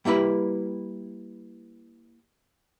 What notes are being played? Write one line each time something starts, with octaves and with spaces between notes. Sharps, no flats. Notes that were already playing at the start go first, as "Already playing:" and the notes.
G3 A#3 E4 B4 B5